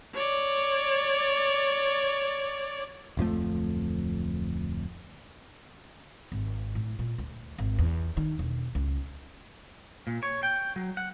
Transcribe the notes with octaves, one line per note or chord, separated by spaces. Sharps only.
C#5 D5
D1 F2 F3 A3
G#1
A2
A#2
D2
G#1
E2
D#3
E1
C#2
A#2
C#5
G5
F#3
F#5